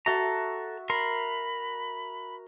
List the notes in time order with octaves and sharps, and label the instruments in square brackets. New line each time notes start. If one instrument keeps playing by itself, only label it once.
[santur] F#4 E5 [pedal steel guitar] A4 A#5
[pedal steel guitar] A#4 C6 [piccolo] B5